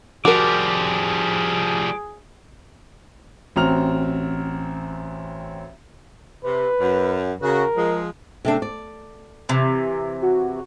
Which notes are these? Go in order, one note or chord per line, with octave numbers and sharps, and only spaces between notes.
F3 G3 F#4 G#4 A#4 D6
A1 C4 F#4 A#5 F6 F7
C3 B4
F#2
C#3 F#4 A#4
F3 G#3
C3 A3 D4
D5
C3 E3
F#4